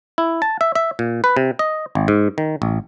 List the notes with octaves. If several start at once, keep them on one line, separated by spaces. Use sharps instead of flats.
E4
A5
E5
E5
A#2
B4
C3
D#5
G#1
G#2
D#3
A1